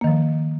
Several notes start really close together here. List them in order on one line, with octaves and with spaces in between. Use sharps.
A#3 D#3 F3